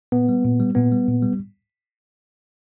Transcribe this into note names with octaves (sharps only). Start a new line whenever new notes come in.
A#2 B3
G3
A#2
G3
A#2 B3
G3
A#2
G3